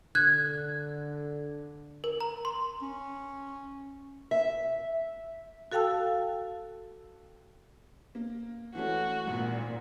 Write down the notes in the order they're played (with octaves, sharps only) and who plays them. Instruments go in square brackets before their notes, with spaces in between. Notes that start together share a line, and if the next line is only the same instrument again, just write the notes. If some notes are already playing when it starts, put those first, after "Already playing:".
[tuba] D3 [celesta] F#6 G#6
[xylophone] A#4
A#5
C6
[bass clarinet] C#4
[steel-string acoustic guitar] E5
[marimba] F#4 A4 F5 G5 A5 E6
[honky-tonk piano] A#3
[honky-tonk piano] E3 A3 C#4 [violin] F#4
[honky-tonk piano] G#1 [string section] A#2